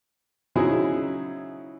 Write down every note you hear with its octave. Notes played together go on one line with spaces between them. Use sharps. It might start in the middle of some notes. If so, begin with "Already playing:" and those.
C#3 F3 F#3 D#4 E4 G#4